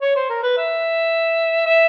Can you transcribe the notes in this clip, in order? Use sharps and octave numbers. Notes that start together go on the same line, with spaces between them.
C#5
C5
A#4
B4
E5
E5